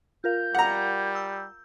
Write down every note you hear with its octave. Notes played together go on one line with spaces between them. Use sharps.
F4 A#4 F5 G6
G3 F#5 A#5
E6 G6